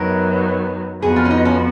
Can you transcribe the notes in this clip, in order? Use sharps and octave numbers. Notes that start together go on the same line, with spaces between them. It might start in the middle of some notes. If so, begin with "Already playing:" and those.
Already playing: F#2 D#3 F#3 B3 A#4
F2 F3 B3 F#4 G#4 B4
F4
C#4
D#4
C#4